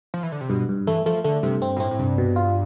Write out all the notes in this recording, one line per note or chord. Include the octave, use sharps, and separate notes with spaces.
F3
E3
D3
C3
G2 B2
G2
E3 A3
F3 A3
D3 A3
G2 C3
C4
B2
A2 C4
A2
C2 G2
B2
F4